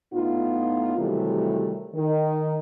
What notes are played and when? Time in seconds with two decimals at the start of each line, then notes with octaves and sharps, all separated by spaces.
0.14 A2 B3 D#4 F4
0.97 C3 D#3 E3 F#3 G3 A3
1.94 D#3